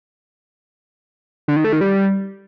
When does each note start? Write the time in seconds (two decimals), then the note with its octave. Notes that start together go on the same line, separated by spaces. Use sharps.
1.48 D3
1.56 D#3
1.64 A3
1.73 D#3
1.81 G3